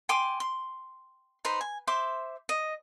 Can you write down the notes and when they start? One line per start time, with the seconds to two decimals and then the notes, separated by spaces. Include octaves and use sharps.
0.09 G5 G#5 C6 D6
0.40 C6
1.45 D#4 B4 C5 B5
1.61 G#5
1.87 C5 E5 C6 D6
2.49 D#5